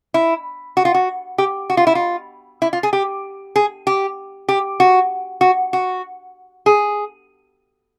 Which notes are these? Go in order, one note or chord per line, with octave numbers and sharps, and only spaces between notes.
E4
F#4
F4
F#4
G4
F#4
F4
E4
F4
E4
F4
G#4
G4
G#4
G4
G4
F#4
F#4
F#4
G#4